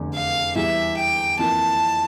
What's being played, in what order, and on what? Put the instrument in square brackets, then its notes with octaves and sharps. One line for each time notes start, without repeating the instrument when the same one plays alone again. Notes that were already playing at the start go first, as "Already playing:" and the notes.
Already playing: [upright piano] F1 E2 D3
[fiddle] F5
[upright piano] E2 E3 G3 [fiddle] E5
[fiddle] G5
[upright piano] F2 E3 A#3 [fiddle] A5